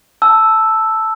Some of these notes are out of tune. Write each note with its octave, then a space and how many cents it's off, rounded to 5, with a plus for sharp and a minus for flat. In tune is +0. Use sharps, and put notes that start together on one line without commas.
A5 +0 E6 +0